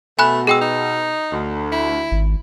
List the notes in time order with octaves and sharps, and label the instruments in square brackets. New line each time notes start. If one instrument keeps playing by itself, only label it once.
[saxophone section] B2 [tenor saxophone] A3 [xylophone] G#5 B5 F#6
[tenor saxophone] G#3 [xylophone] G#4 G5 E6
[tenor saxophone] D#4
[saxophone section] D2
[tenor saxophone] E4
[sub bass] G#1